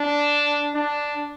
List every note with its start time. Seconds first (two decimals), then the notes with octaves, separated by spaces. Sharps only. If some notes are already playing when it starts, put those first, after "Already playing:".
Already playing: D4
0.74 D4